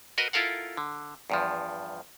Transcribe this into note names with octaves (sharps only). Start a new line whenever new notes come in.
F#4 A#4 B4 D#5
E4 F4 A4 A#4 F5 F#5
D3
E2 G2 F3